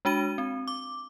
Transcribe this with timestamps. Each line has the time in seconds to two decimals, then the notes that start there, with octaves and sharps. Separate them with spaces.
0.05 G#3 D4 F#4 D#7
0.38 C4
0.68 D6